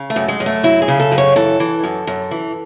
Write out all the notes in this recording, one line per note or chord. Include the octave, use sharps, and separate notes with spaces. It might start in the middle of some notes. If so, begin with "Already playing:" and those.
Already playing: C#3
A3
F#2
G#3
F#2
A3
F#3 E4
G#4
C#3
A4
F#2
C#5
E3 A4
E3
F#2
F#2
E3